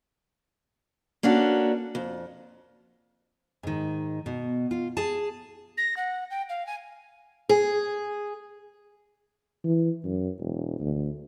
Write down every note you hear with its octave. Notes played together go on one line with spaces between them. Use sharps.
A#3 C#4 D4 F#4 A4
F2
G#2 D#3
B2
F4
G#4 A5
A#6
F#5
G5
F5
G#5
G#4
E3
F#2
E1
D2